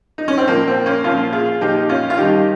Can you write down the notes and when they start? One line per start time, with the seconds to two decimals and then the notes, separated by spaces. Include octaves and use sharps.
0.18 D#4
0.28 C#4
0.38 C4
0.48 A#2 F3 A#3
0.68 C4
0.86 A#3 C#4
1.04 A#2 F3 C#4 F4
1.33 F4 G#4
1.61 A#2 F3 D#4 G4
1.89 C#4 F4
2.10 F4
2.17 G2 D#3 D#4 G4